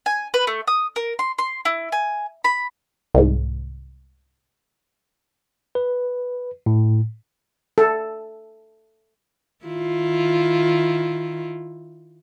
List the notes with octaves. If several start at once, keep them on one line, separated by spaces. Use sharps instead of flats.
G#5
B4
A3
D#6
A#4
C6
C6
E4
G#5
B5
C2 G#2
B4
A2
A4
D#3 E4 F4